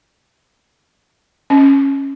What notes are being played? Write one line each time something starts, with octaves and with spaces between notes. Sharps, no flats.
C#4